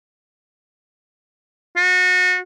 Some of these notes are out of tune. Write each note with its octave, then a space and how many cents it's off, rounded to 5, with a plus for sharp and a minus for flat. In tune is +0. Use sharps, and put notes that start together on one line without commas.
F#4 -30